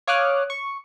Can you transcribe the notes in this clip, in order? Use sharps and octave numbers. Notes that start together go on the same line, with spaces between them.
C#5 F5 D6 D#6 F6 F#6
C#6